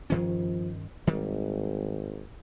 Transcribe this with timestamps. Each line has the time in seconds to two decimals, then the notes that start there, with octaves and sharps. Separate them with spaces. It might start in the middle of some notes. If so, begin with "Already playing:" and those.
0.10 G2 D#3 F3 C#4
1.07 G#1 D#3 G3